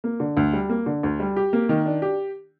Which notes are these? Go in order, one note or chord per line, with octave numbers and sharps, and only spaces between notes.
A#3
D3
D2
G3
A#3
D3
D2
G3
G4
A#3
D#3
D4
G4